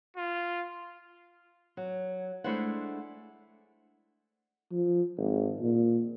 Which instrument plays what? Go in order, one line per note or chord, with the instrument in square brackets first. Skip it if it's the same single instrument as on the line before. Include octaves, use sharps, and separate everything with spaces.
[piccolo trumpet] F4
[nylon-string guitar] F#3
G#3 A3 D4 E4 C5 F#5
[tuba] F3
G#1
A#2